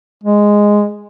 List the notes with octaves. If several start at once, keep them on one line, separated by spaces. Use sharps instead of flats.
G#3